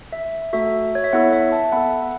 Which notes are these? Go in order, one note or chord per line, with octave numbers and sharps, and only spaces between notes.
E5
A3 F#4 A4 E5
C#5
E5
B3 E4 A4 C#5 F#5
E5
E5 A5
B3 A4 F#5 B5
F#5